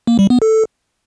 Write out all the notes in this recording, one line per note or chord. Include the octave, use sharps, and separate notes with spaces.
A#3
G3
B3
A4